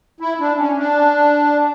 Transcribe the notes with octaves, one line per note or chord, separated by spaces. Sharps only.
E4
D4
C#4
D4